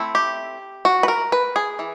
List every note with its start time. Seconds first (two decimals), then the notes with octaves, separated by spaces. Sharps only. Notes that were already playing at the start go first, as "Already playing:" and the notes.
Already playing: A3 C4 E4
0.15 G4
0.85 F#4
1.03 B4
1.08 A#4
1.32 B4
1.56 G#4
1.79 E3